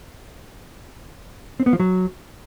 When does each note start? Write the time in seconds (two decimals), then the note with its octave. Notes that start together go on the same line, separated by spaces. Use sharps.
1.60 C4
1.66 B3
1.73 F3
1.80 F#3